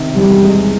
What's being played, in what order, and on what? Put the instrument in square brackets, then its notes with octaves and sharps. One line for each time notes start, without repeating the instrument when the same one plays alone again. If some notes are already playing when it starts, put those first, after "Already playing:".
Already playing: [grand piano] C3 D#3
[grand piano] E2 [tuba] G3
[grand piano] G#3